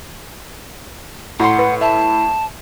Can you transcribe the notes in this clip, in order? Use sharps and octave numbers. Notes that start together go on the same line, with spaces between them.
A2 F#5 A#5 C6
B4
E5 A5